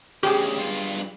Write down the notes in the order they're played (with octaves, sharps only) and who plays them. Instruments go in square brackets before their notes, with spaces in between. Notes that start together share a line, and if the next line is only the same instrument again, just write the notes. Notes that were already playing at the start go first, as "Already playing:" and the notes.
[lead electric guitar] D2 C#3 [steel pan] G4 G#4
[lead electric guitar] G2 F4